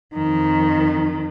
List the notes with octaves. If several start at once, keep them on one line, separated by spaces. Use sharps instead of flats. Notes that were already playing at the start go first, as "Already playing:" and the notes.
F2 D#3